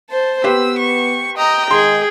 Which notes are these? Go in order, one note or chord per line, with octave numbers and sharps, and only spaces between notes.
C5 A5
B3 G4 B4 C5 E6
C#6
D#5 G5 A#5
D#3 G#3 G#4 C6